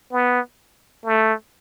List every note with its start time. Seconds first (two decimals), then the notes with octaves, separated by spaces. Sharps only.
0.12 B3
1.05 A3